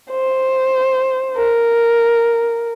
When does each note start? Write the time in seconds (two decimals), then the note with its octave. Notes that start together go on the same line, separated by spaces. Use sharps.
0.11 C5
1.37 A#4